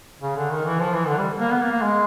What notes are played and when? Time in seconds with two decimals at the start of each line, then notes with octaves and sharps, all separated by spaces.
0.22 C#3
0.37 D3
0.51 D#3
0.65 E3
0.80 F3
0.93 E3
1.07 D3
1.18 G3
1.40 A#3
1.51 B3
1.61 A#3
1.72 A#3
1.82 G#3